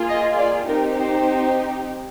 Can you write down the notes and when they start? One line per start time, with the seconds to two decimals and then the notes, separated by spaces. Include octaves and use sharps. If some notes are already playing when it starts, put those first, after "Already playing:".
Already playing: A#3 F4 G#4
0.09 D#5
0.37 D5
0.68 C4 D#4 G4 A#4
0.98 C5